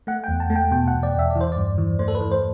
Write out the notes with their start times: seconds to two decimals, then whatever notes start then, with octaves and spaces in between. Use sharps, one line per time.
0.07 A3 F#5
0.24 E2 G5
0.40 A5
0.50 A3
0.56 G5
0.71 B2 G5
0.88 F#5
0.93 E2
1.03 D5
1.14 E2 E5
1.30 E3 D5
1.41 C5
1.52 G2 D5
1.78 E3
1.99 A3 C5
2.08 A4
2.15 B4
2.20 E3
2.31 C5